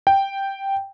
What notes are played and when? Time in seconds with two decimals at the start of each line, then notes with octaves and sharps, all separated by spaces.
0.07 G5